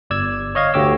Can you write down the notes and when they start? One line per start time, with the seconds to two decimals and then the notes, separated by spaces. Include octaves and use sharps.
0.10 G1 D5 E6 G#6
0.55 C#5 D#5 F5 G#6
0.74 D2 D3 G4 C#5 D6 E6